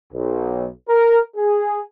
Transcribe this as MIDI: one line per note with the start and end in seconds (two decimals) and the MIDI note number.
0.13 0.66 35
0.88 1.19 70
1.36 1.80 68